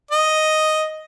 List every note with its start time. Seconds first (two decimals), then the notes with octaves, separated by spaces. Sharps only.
0.11 D#5